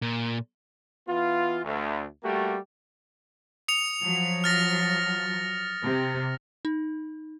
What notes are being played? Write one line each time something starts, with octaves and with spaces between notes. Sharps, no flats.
A#2
E3 B3 F4
D2
G3 A3 A#3 F#4 G4
D#6 C#7 F7
F3 F#3
F6 A6 A#6
C3
D#4